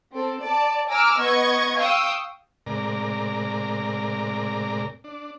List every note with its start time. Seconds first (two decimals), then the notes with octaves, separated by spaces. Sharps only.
0.13 C4 A4
0.42 D5 A5
0.88 G#5 A#5 D6 E6 F6
1.18 B3 D#5 C#6 G#6
1.78 F5 G5 C#6 D#6 E6
2.66 A2 C3 G#3 A#4 D5 A#5
5.04 D4